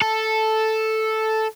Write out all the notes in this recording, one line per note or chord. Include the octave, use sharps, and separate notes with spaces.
A4